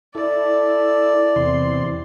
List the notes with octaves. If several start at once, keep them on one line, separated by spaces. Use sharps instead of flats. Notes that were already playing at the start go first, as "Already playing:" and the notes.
E4 A4 D5
E2 C3 C6